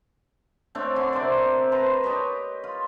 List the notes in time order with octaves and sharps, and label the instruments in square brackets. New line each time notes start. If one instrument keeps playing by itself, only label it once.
[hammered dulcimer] A3 C4 D4 C#5
D3 G#5 D6
C3 A#4 C5 D5
B4 C5 A5 A#5
G4 C#5 D#5 A5
F4